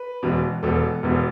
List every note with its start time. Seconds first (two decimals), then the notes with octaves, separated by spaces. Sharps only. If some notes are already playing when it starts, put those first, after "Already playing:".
Already playing: B4
0.23 E1 E2 B2
0.63 E1 E2 B2 A4
1.03 E1 E2 B2